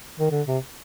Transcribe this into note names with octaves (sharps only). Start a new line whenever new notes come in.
D#3
D3
C3